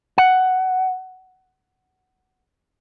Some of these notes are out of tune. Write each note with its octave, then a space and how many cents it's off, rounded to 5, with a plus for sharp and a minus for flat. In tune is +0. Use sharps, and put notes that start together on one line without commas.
F#5 +10